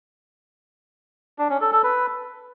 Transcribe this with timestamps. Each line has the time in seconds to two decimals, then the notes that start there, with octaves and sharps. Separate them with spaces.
1.39 D4
1.50 C#4
1.61 A4
1.72 A4
1.83 B4